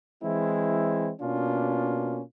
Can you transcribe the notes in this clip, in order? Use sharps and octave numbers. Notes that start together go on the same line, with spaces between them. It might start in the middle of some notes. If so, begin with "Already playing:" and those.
E3 G#3 C4 E4
B2 A#3 C#4 D4 F4